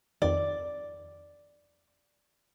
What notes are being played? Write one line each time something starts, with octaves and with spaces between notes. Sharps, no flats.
F2 D#3 D5